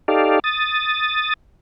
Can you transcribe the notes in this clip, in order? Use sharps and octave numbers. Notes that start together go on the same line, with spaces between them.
D#4 G4 A4 D5 F5
D#6 A6